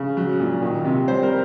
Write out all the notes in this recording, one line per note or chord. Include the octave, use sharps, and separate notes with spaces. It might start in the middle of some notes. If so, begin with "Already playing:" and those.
Already playing: C#3
F#3
A#2
D#3
C3
G3 C5
A#4